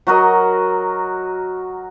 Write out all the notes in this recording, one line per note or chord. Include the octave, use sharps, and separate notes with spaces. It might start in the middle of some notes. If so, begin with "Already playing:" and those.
F#3 F#4 A#4 D#5